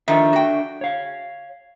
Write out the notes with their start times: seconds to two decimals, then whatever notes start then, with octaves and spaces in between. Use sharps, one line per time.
0.08 D#3 F3 D4 A4 E5
0.33 F#4 G5
0.81 C#5 F5